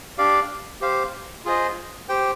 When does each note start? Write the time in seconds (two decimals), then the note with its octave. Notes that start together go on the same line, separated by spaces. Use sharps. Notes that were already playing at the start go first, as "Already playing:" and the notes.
0.18 D4 G4 D5 F5
0.81 G4 C5 F5
1.45 F4 G#4 C5 D#5
2.09 G4 C5 G5